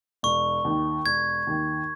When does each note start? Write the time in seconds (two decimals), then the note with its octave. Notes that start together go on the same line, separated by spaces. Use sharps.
0.23 E1 C#6
0.65 D#2 D#3
1.05 E1 G#6
1.47 D#2 D#3